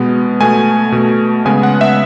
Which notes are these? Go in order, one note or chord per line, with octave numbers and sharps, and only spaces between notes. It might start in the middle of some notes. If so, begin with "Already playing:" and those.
Already playing: B2 G#3 B3
B2 A3 G#5
B2 A3
C#3 G#3 B3 G#5
F#5
E5